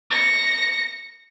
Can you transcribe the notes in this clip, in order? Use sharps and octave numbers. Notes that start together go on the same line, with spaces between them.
A#6 C#7